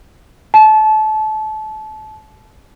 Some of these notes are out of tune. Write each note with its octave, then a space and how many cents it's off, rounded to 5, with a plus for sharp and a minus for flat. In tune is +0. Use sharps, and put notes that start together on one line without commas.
A5 -25